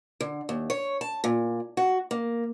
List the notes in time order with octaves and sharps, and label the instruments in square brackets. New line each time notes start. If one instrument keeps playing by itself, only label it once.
[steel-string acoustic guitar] D3
D#2
C#5
A5
A#2
F#4
A#3